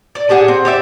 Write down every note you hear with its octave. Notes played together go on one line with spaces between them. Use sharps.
D5
D4 G4 G#4 F#5
C4
G4 D5 E5